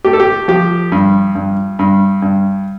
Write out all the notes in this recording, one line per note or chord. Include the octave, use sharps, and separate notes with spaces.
A3 G4
A4
G4
F3 G4
G2
G2
G2
G2